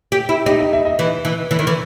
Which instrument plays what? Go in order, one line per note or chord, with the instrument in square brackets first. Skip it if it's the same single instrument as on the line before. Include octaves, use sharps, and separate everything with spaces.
[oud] G4
E4
[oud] D#4 [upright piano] G4
[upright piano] D#5
E5
D#5
[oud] E3
E3
E3
D#3
E3